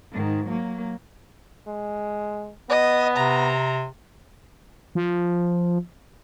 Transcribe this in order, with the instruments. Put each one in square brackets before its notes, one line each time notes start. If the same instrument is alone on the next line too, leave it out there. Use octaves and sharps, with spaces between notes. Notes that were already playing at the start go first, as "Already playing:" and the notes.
[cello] G#2 D#3
F#3 A#3
[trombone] G#3
[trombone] B3 [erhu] D#5
[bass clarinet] C3 [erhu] A#5
[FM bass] F3